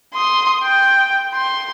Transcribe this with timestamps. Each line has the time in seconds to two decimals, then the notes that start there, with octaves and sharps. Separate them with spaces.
0.14 C6 D#6
0.64 G5
1.35 C6